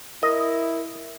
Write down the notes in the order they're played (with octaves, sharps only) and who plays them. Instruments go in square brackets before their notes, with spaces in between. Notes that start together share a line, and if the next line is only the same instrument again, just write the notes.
[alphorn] E4 [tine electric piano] A#4 [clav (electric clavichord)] D#5